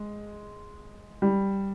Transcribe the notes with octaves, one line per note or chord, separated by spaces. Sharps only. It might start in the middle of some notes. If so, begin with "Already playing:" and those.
Already playing: G#3
G3